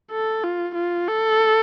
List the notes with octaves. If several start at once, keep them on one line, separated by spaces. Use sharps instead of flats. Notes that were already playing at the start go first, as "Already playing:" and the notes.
A4
F4
F4
A4